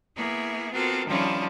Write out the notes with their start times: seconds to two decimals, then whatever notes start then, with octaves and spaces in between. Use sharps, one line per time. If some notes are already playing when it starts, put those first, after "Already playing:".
0.16 A#3 B3 E4 G#4
0.73 B3 C4 F4 F#4 A4 A#4
1.08 D#3 F3 G3 C#4 D4 E4